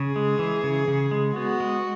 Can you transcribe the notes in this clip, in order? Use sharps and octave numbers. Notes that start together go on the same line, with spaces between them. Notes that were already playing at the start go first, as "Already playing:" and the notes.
Already playing: C#3 G#4
G#3
E3
C#3
C#3
G#3
B3 F#4
G#3